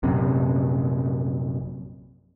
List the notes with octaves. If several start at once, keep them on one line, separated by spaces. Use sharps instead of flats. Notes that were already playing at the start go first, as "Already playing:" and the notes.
A#1 F#2 C3